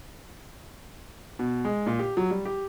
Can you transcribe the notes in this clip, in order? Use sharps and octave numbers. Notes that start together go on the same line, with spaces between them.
B2
G#3
A#2
G4
F#3
G3
G4